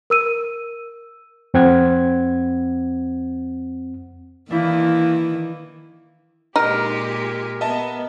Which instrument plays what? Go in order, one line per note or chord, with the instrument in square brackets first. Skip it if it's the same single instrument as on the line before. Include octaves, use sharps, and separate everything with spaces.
[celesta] A#4 E6 D#7
[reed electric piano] F2 C4 F#5 G#6
[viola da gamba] D#3 E3 [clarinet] A#3 [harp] D4 E4
[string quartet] A#2 G#3 G4 [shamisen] D#4 [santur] A#4
[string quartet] B3 [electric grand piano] D#5 E5 A5